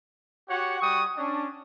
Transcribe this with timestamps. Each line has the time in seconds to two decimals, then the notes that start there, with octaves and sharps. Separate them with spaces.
0.49 F#4 G4 C#5 F#5
0.80 G3 F#4 G5 C#6 D#6
1.17 C#4 D4